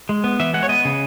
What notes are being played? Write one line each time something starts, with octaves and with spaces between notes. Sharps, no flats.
G#3
B3
E3 E5
G#3 F#5
C#5
B3 D#5
C#3